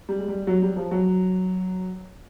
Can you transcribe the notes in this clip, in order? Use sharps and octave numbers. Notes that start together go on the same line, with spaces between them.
G3
G#3
G3
F#3
G3
F3
F#3